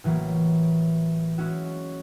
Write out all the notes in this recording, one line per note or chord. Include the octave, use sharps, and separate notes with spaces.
A1 E3 F#3 A#3
G#3 C#4 E4 F#4